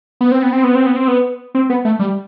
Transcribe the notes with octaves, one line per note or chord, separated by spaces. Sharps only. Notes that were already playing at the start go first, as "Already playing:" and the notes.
B3
C4
B3
C4
B3
C4
B3
C4
B3
C4
B3
A3
G3